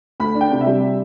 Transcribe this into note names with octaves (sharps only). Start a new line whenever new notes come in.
D2 B5
D4
G5
C3
E5
G3